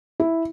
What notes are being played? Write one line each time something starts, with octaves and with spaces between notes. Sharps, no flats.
E4